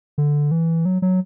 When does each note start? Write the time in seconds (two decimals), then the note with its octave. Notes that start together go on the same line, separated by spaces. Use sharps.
0.18 D3
0.51 E3
0.85 F#3
1.02 F#3